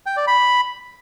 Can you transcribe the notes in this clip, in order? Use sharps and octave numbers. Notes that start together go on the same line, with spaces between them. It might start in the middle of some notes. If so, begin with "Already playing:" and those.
G5
D5
B5